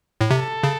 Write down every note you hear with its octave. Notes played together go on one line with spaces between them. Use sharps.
A2
C3 A4
C#3